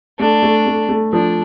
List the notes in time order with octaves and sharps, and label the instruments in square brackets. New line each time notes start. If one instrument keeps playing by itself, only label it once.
[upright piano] A3 [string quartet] D4
[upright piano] A3
A3
A3
[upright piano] F3 [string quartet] D4